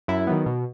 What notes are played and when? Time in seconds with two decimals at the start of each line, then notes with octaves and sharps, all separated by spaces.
0.08 F#2 E4
0.27 D#3 F#3 B3
0.46 B2